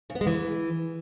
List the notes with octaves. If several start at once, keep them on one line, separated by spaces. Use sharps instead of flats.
C#3
B3
G#3
E3